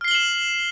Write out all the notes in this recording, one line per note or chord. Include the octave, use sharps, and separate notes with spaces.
F6 C7 E7 F#7 G7